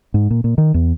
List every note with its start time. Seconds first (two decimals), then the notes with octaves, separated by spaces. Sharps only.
0.14 G#2
0.30 A#2
0.44 A#2
0.58 D#3
0.74 E2